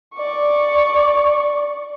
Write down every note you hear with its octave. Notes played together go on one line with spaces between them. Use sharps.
D5 C#6